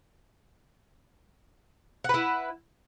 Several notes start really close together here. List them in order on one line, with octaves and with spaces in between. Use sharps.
F#5 B4 E4